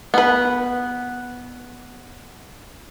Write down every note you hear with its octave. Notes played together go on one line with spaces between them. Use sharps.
B3 B4